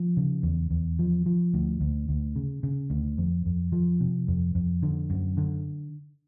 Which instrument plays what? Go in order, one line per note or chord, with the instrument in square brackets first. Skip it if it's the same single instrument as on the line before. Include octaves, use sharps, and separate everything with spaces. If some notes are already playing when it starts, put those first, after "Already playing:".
Already playing: [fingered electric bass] F3
C#3
E2
E2
F3
F3
D2
D2
D2
C#3
C#3
D2
F2
F2
F3
C3
F2
F2
D3
F#2
D3